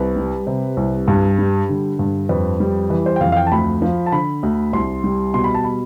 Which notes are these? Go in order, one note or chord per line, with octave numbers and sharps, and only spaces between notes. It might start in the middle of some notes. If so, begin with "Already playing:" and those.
Already playing: C2 B4
G3
C3
C2
G2
G3
D3
G2
F2 B4
G3
E3 B4
C5
G5
F2 F5
F5
G5
A5
D2 B5
F3
A5
D3 B5
D2
C2 C6
G3
B2 C6
B5
A5
B5